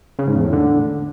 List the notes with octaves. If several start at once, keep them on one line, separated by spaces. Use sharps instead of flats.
C#3
G#2
E2
A2
D3